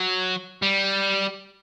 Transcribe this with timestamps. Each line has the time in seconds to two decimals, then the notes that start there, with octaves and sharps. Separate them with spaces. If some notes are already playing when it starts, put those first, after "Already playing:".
Already playing: F#3
0.62 G3